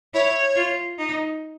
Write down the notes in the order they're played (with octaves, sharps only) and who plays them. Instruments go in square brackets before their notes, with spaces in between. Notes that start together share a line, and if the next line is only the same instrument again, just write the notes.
[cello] E4 [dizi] C#5
[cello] F4
D#4